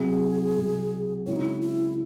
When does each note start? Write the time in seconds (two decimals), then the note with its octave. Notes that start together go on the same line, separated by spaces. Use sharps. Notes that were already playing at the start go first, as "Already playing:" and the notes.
Already playing: C2 C3 F#3 G#4
0.56 C2 C3 F#3
1.26 C#3 G#3 C4 E4 F#4 C#5
1.36 D#4
1.45 E4
1.62 E4